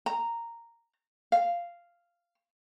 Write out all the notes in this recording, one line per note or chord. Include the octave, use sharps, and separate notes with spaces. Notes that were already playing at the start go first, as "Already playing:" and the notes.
A#5
F5